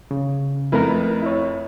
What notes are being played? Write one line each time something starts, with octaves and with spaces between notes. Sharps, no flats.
C#3
F2 A3 E4 A#4 B4
E4 C#5